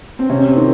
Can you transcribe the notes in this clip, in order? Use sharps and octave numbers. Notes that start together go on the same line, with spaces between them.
C4
C3 C#4
C4
D#3